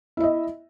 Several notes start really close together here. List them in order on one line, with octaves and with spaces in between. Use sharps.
E4 E5 D#5